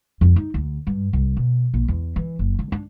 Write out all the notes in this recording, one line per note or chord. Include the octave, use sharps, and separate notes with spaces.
F2
D#4
D2
G2
C2
B2
A#1
E2
E3
F#1
D3
D4